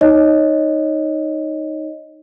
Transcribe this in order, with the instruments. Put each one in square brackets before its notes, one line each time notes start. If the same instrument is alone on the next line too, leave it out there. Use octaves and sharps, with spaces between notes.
[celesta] D#4 C#5 D#5